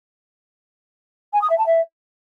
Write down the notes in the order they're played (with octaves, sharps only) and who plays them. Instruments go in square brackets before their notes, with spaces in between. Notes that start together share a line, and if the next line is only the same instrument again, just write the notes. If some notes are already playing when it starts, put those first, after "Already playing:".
[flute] G#5
D#6
E5
A5
E5